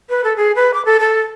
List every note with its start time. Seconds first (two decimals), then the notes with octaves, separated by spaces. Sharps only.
0.09 B4
0.24 A4
0.36 G#4
0.56 B4
0.74 D6
0.85 A4
1.00 A4